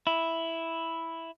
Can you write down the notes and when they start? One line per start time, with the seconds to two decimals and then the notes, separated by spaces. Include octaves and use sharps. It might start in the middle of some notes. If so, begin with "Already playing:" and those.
0.07 E4